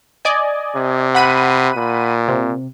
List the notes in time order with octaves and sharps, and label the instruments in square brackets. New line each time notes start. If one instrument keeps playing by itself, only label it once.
[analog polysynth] D5 D#5 G#5
[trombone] C3
[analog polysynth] F#5 B5 D#7
[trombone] A#2
[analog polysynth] C3